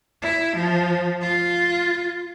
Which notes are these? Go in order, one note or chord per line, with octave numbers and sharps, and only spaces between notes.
E4
F3
F4